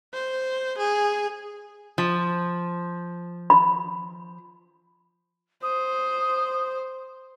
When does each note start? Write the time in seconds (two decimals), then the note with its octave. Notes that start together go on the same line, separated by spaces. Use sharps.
0.13 C5
0.78 G#4
1.98 F3
3.50 B5
5.63 C5 D#6